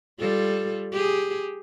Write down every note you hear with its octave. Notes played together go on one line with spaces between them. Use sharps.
G3 F4 A4
G4 G#4